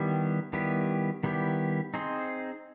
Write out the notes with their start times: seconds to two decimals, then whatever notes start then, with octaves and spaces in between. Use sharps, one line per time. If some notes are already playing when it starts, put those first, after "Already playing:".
Already playing: D#3 G3 B3 E4 G4
0.53 D#3 G3 B3 E4 G4
1.23 D#3 G3 B3 E4 G4
1.94 C4 D#4 G#4 C5